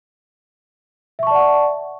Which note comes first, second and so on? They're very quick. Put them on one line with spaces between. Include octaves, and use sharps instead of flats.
E5 C#6 A5 D5 F#5